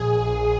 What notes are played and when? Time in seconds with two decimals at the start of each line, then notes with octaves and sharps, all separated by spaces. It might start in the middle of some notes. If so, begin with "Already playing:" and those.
Already playing: A#1 G#4